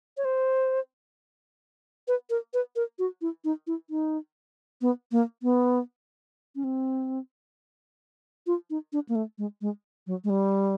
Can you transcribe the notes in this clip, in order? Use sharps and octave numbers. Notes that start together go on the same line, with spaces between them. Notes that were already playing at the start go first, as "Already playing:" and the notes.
C#5
C5
B4
A#4
B4
A#4
F#4
E4
D#4
E4
D#4
B3
A#3
B3
C#4
C4
F4
D#4
D4
A#3
A3
G#3
G#3
F#3
G#3
G3